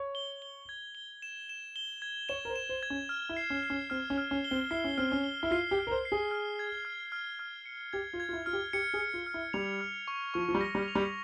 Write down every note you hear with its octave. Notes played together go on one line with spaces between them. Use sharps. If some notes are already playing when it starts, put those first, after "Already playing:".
Already playing: C#5
G7
G7
G#6
G7
E7
E7
G7
G#6
C#5 E7
A#4
C5
E7
C5
G#6
C#4
F6
E4
C7
C#4
C7
C#4
C4 F6
C#4
F6
C#4
G7
C4
E4 C7
C#4
C4 F6
C#4
G7
E4
F4 C7
G4
F6
A#4
C5
C7
G#4
F6
G#6
F6
F6
F6
C#7
G4 G#6
F4
G#6
F4
E4
F4 F6
G4
G4 C#7
G#4
C#7
F4
F6
E4
G3 F7
F6
C#6
F3 C#6
F3
G3
A#6
G3
F7
G3